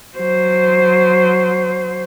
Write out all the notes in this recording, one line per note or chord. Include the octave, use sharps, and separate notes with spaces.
F#3 C5